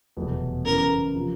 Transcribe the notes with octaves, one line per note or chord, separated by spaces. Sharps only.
F1 E2 B2 F#3 A3
F#2 C#3 E3 A3 A#4
C3 F3